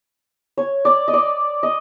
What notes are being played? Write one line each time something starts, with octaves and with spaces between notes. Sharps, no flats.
C#5
D5
D#5
D5
D#5